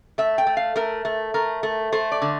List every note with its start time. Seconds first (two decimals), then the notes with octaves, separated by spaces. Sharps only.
0.18 A3 E5
0.38 G5
0.47 A3
0.57 F5
0.76 A3 A#4
1.05 A3
1.34 A3 A#4
1.63 A3
1.92 A3 C5
2.12 D5
2.22 D3